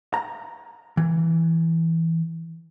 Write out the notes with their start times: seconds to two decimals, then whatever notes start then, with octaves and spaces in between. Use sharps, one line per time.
0.14 A#5
0.97 E3